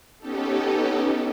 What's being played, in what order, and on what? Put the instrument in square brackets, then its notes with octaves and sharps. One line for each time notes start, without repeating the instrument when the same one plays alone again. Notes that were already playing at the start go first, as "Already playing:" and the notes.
[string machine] B3 C#4 D#4 G4 A4